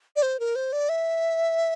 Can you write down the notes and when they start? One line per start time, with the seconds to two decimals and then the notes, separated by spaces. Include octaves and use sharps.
0.16 D5
0.22 C5
0.40 A#4
0.56 C5
0.73 D5
0.89 E5